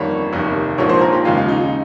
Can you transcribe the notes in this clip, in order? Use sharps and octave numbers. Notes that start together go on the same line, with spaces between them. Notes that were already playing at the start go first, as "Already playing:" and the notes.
Already playing: G1 F2 D#3 G3 A#3 C#5
F1 D#2 D#3 A#3
A#1 G#2 F3 A#3 C#5
C5
A#4
G4
D#2 C#3 G#3 F4
F4
D#4
D#4